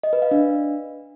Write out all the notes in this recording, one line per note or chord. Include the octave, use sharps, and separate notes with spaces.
D#5
B4
F5
D4